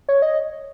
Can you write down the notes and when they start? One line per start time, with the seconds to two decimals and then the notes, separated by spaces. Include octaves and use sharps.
0.09 C#5
0.22 D#5